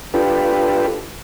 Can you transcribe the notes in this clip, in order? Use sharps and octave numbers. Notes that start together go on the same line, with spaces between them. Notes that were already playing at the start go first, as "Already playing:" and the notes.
D4 F4 G4 A4 B4